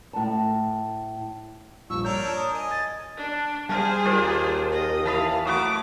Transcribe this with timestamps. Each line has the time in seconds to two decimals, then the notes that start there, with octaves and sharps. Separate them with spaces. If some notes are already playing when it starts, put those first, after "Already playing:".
0.13 A2 A5
1.90 A#1 G2 C#6 E6
2.04 D4 A#4 C#5 A#5 G6
2.24 A5
2.36 D#6
2.54 D#5 G#5
2.71 G#6 A6
3.17 D4
3.69 G3 G#4 C5 F5 G#5 A5
4.06 D#2 F4 D5 A#5
4.72 D#5
5.05 E3 F5 A5 B5 D#6
5.45 F#3 A3 B4 A5 D6 D#6